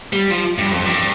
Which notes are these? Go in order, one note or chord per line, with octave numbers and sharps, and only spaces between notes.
G3
F3
G2
F2
G2